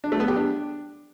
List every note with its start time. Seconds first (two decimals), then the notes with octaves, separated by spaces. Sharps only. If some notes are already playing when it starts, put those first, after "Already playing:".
0.04 D4
0.12 A3
0.20 B3
0.28 G4
0.36 D4